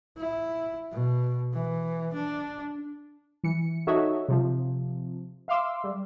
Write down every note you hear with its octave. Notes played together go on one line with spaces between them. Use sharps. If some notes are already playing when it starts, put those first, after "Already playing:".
E4
B2
E3
D4
E3 C#7
D#4 F#4 A4 C#5 D#5 E5
C3 F3
E5 F5 C6 D6 E6
G3